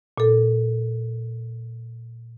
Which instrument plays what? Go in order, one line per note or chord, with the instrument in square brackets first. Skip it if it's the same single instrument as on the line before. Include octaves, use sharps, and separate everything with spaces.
[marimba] A#2 A4